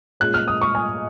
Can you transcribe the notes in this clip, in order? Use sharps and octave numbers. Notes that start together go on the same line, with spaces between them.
A#2 G#3 C#4 F#6
F6
D#6
C#6
G#5